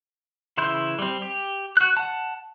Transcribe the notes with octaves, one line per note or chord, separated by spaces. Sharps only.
C#3 E3 E4 C6 G6
G3 C4
G4
F#4 F#6
F#5 A5